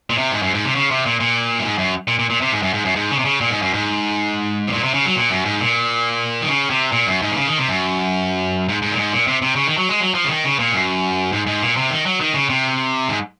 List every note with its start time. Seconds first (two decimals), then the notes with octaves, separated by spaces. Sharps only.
0.10 A#2
0.18 C3
0.32 G#2
0.42 F#2
0.54 G#2
0.64 C3
0.75 C#3
0.91 C3
1.06 A#2
1.20 A#2
1.59 F#2
1.65 G#2
1.78 F#2
2.08 A#2
2.19 A#2
2.30 A#2
2.41 C3
2.52 G#2
2.62 F#2
2.73 G#2
2.85 F#2
2.95 G#2
3.11 C#3
3.19 C3
3.25 C#3
3.41 A#2
3.50 G#2
3.62 F#2
3.74 G#2
4.68 C3
4.72 A#2
4.83 C3
4.94 C#3
5.05 F#3
5.16 A#2
5.30 F#2
5.45 G#2
5.61 A#2
6.42 D#3
6.48 C#3
6.70 C3
6.92 A#2
7.07 F#2
7.22 G#2
7.32 C3
7.36 C#3
7.47 D#3
7.58 C3
7.69 F#2
8.69 G#2
8.82 G#2
8.92 A#2
8.97 G#2
9.12 A#2
9.27 C3
9.42 C3
9.56 C#3
9.67 D#3
9.77 F#3
9.89 G#3
10.01 F#3
10.14 F3
10.24 C#3
10.29 D#3
10.45 C#3
10.59 A#2
10.73 F#2
11.32 G#2
11.46 G#2
11.62 A#2
11.77 C3
11.90 D#3
12.06 F#3
12.20 D#3
12.34 C#3
12.49 C3
13.09 G#2